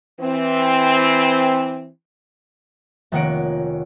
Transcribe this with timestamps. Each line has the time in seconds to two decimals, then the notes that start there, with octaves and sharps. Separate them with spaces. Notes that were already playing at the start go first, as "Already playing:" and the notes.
0.20 E3 C4
3.12 F1 D#3 A#3 C#5 F#5 D7